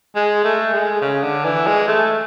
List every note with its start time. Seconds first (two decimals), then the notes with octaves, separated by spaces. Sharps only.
0.16 G#3
0.44 A3
0.73 G#3
1.01 C#3
1.23 D3
1.45 E3
1.67 G#3
1.87 A3